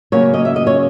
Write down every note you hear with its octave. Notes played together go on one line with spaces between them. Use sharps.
C#3 F#3 A#3 C#4 C#5
D#5
E5
D#5
C#5